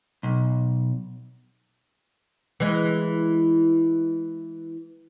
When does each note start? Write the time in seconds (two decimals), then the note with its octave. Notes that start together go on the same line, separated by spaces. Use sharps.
0.23 B1
2.60 E3 G#3